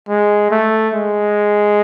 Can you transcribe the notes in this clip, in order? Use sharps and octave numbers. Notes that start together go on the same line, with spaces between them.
G#3
A3
G#3